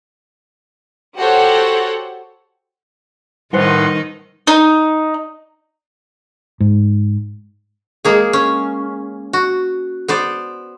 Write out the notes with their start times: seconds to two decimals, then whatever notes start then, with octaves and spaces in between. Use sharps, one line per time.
1.19 F#4 G4 A4 C5 C#5 F#5
3.53 A2 D#3 G3 D#4 B4 C5 F#5 C6
4.47 D#4
6.60 G#2
8.05 G#3 A#3 G#4
8.33 C#4
9.33 F#4
10.08 B3 C5 D5